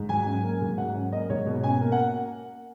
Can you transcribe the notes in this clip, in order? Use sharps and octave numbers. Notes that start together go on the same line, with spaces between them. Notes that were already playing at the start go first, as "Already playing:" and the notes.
Already playing: G#2
F#3 G#5
C#4
A#3
G#2
F#3 F#5
C#4
A#3 D#5
G#2 C#5
B2
C#4 G#5
A#3
F#5